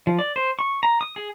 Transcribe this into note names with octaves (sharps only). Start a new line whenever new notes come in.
F3
D5
C5
C#6
A#5
D#6
G#4